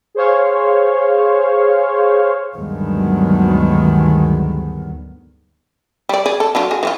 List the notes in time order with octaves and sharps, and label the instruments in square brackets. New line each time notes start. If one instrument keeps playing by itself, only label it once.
[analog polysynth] G#4 C5 C#5 F5
[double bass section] D2 G2 D#3 F#3 G#3 B3
[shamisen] G3 D5
G#4 D5
A4
F#3 D4 F4
F#4 G#4
E3 C4 F4